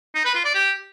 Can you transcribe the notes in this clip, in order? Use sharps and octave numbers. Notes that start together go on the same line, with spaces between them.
D#4
B4
F4
D5
G4